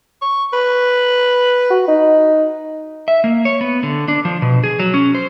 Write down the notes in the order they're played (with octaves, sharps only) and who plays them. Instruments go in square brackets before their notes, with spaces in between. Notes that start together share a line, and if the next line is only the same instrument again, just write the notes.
[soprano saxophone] C#6
B4
[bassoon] F#4
D#4
[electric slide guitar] E5
A#3
C#5
B3
D3
D4
F3
B2
G#4
F#3
C#4
C5